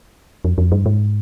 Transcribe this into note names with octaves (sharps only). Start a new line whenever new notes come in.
F2
F2
G2
G#2